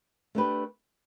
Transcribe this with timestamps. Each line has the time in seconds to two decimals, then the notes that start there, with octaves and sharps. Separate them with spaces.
0.35 A3 D4 G4 B4